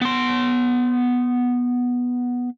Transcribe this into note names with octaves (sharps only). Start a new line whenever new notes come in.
B3 C6